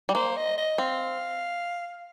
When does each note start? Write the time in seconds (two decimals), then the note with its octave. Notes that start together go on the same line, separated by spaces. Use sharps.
0.09 G3
0.15 A#3 C5
0.37 D#5
0.57 D#5
0.78 C4 F5